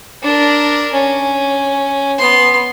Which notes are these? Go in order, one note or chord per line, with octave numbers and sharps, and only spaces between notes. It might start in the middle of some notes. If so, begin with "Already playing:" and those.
D4 A#4
C#4
B3 C6